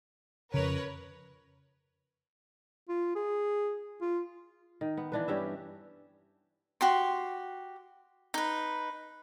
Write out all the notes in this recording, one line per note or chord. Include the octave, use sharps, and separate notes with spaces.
F2 C#3 A#4 B4 C#5
F4
G#4
F4
D#3
B3
E3 D4 B4
G2 C#4 G4 E5
F#4 G4 C6
D#4 B4